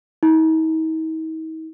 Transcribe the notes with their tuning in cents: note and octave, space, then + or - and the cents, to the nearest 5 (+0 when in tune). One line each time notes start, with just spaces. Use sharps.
D#4 +45